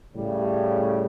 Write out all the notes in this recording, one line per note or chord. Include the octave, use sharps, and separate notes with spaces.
A2 C#3 G3